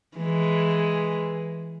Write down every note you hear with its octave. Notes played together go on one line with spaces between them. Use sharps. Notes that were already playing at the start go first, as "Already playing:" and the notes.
E3 G#3